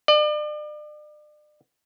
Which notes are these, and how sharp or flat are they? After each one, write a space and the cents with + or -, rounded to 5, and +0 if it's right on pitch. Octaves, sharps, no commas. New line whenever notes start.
D5 +40